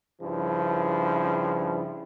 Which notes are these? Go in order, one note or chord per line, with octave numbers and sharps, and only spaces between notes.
G2 C#3 F3 E4